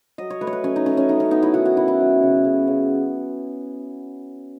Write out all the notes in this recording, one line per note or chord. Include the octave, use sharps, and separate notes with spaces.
F#3 D#5
C#5
A3 B4
C#5
B4
F#3 C#4
D#4
A3 C#4
C#4
B3 D#4
C#4
B3 D#4
E4
D#3 F#4
F#4
D#3 E4
E4
F#3
C#3
C#3
C#3